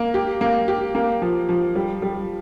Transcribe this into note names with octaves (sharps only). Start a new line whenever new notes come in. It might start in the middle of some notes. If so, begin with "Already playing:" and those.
Already playing: A#3
G4
A#3
G4
A#3
F3
F3
G3
G3